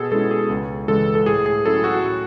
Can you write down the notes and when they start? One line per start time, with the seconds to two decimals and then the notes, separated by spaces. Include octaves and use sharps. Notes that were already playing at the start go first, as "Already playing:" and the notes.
Already playing: B2 G#4 A4
0.12 G#3 C#4 E4 A4
0.31 G#4
0.49 C#2
0.88 C#3 E3 G#3 A4
1.15 A4
1.26 A2 G#4
1.46 G#4
1.65 F#3 C#4 E4 A4
1.84 F#4
2.04 A2